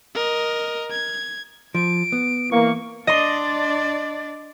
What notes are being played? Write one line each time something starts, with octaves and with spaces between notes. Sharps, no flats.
A#4 D#5
G#6
F3 D7
B3
E3 A#3 C#6
D4 D5 D#5 C6